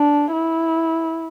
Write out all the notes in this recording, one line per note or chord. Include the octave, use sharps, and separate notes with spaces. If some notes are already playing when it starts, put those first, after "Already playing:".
Already playing: D4
E4